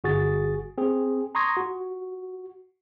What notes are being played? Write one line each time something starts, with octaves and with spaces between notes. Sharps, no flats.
G1 F#4 G#4 A6
C4 G#4
A#5 C6 C#6 D#6 G#6 A#6
F#4